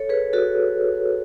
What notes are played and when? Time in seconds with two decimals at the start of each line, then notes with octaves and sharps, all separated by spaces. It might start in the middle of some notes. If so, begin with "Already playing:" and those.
Already playing: A4 C#5
0.09 G#4 B4
0.33 F#4 A4